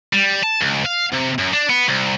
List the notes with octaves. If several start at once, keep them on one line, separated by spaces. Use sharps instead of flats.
G3
A5
C#2
F5
C3
F#2
D4
B3
C2